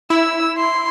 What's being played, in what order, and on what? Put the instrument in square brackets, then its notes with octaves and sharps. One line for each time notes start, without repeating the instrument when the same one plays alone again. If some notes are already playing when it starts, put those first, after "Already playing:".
[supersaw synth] E4 [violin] E6
[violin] C6